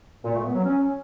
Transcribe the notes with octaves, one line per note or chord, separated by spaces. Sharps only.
A#2
A3
B3
F#3
C#4